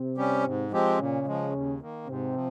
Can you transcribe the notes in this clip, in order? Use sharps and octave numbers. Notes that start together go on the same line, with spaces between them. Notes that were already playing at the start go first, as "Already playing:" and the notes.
Already playing: C3 C4
G3 C#4 G4
G#2
F3 G#3 C4 G4
A#2 C#3 C#4
F3 G#3
D#2
D#3 A#3
G#2 C3 C4
F3